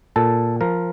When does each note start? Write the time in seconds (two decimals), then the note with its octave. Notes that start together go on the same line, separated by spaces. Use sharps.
0.16 A#2 A4
0.61 F3 A#4